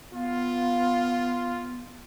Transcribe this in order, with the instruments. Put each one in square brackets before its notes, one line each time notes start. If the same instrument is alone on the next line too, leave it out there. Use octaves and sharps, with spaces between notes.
[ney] B3 [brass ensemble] F4